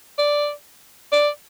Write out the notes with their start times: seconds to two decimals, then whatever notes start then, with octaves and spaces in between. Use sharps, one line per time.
0.18 D5
1.12 D5